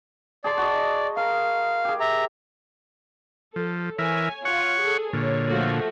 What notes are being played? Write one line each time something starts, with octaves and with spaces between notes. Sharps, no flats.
G#4 D5 A5 C6
F#4 D#5
A#4 F5
G4 G#4
E5 A#5
F3 A4
E3 A#4 C#5 E5 G#5
F4 C#5 F#5 C#6
G#4 A4
A#2 D3 C#5
F3 A3 F#4